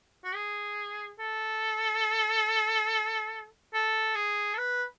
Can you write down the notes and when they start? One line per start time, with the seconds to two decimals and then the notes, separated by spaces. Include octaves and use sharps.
0.24 F#4
0.35 G#4
1.19 A4
3.74 A4
4.15 G#4
4.54 A4
4.58 B4